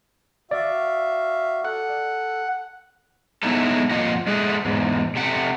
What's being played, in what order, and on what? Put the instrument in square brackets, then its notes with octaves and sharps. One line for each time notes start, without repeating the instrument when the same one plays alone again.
[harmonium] F#4 E5 F5 [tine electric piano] D5
[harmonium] A4 [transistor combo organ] F#5
[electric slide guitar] F#3 G#3 B3 D#4 E4 A4
F2 A#3 F4 D#5 F#5
G#3 A3 G#4 F#5
E2 G#2
C3 A3 F#5